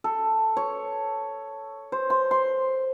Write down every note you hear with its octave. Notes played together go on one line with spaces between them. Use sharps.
A4
C#5
C5
C6
C6